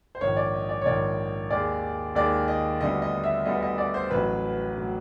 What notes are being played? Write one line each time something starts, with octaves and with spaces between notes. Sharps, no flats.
C5
A#1 G#2 D#3 C#5
D5
D#5
D5
C#5
A#1 G#2 D#3 D5
D#2 D#3 G#3 D5
D#2 D#3 G#3 D5
D#5
D2 D3 G3 B3 D#5
D#5
E5
D2 D3 G3 B3 D#5
D#5
D5
C5
A1 A2 F#3 B4
A2 F#3